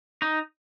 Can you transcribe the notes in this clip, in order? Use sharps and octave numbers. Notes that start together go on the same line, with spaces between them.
D#4